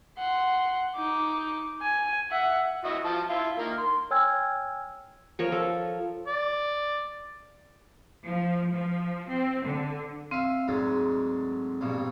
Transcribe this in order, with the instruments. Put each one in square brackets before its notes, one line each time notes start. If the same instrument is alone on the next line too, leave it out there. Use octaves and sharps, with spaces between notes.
[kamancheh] F#5 C6
D#4 D6
G#5
E5 F#5
[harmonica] E4 F#4 D#5
F3 A5
E4 F4
D#3 A#3 A#4
C6
[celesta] C#5 G5 G#5 E6 F6 G#6
[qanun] F3 A#4 C#5
A4
[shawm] D5
[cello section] F3
F3
C4
D3
[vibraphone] C4 [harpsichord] E5 F5
[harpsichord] D2 G#2 F#3
A#1 G2 B2